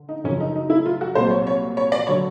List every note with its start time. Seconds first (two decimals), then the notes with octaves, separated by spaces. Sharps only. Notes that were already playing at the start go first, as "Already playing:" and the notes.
Already playing: D3
0.09 D#4
0.24 F#2 C#3 F3 C#4
0.40 D#4
0.56 D#4
0.70 E4
0.86 F4
1.01 F#4
1.15 C2 A#2 F#3 C5
1.31 C#5
1.47 C#5
1.77 C#5
1.92 D5
2.07 D3 F#3 C#5